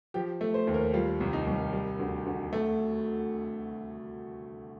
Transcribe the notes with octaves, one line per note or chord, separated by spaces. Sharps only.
F3 G4
A3
C5
D#2
A#4
G3 F4
C2
D#4
C2
G3
D2
D2
A3